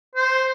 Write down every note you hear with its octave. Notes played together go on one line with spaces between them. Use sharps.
C5